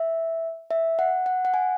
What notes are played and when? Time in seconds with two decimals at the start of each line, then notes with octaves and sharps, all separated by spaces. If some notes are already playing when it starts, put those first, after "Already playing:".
Already playing: E5
0.71 E5
0.99 F#5
1.26 F#5
1.45 F#5
1.54 G#5